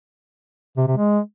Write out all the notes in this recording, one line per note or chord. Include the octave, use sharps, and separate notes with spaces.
C3
C3
G#3